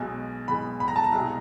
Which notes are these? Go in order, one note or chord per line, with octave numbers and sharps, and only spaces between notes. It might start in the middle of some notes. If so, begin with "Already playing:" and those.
Already playing: B1 B2 G#3
B1 B2 G#3 B5
B5
A#5
A5
A#5
C2 B2 G#3